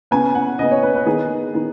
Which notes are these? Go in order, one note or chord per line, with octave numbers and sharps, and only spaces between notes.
C#3 B3 G#5
F#5
C#3 B3 D#5
C#5
B4
B4
D#3 B3 G#4
D#3 B3